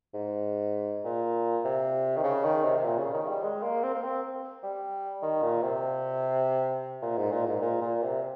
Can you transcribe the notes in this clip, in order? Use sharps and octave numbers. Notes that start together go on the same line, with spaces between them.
G#2
A#2
C3
D#3
C#3
D#3
C3
C3
A#2
C#3
D#3
G3
G#3
A#3
C4
A#3
C4
G3
D#3
A#2
C3
A#2
G#2
A#2
G#2
A#2
A#2
C3